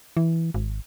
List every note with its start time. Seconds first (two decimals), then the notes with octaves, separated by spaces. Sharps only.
0.17 E3
0.54 G#1